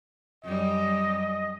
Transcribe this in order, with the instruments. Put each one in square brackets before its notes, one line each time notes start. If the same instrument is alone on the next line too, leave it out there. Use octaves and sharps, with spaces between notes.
[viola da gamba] F#2 G3 [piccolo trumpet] D#5